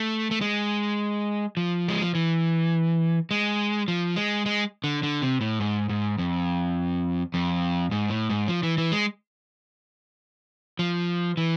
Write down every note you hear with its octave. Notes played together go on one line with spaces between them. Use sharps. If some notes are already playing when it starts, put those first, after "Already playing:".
Already playing: A3
A3
G#3
F3
G#3
F3
E3
G#3
F3
G#3
G#3
D3
D3
C3
A2
G#2
G#2
F2
F2
G#2
A2
G#2
F3
E3
E3
G#3
F3
E3